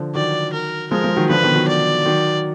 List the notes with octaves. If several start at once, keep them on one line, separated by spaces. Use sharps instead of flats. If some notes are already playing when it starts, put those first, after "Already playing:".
Already playing: D3 F3
D#3 F#3 D5
A#4
F3 G#3 A#4
F3 G#3
D#3 F#3
D3 F3 B4
B2 D#3
D#3 F#3
D5
D#3 F#3